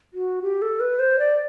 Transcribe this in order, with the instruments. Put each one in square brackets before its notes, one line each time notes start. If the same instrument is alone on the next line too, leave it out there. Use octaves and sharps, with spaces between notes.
[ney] F#4
G4
A4
B4
C5
D5